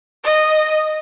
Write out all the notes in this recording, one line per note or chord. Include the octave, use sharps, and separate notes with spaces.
D#5